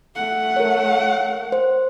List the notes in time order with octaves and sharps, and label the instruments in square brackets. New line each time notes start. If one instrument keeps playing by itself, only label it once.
[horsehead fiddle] A3 F#5
[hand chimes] A#4 C#5
C5